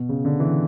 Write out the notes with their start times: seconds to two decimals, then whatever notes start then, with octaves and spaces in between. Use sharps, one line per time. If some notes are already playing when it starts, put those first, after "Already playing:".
Already playing: B2
0.09 C#3
0.25 D3
0.40 E3